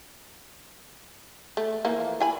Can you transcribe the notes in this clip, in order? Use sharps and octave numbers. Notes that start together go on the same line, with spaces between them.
A3
E3 F3 A#3
E4 G#5 B5